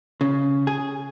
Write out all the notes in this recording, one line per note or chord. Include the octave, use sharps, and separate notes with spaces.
C#3
G#4